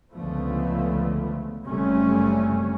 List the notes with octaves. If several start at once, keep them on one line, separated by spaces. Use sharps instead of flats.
C#2 D3 F3 A3 B3
F#1 F#2 C3 G3 A3 C#4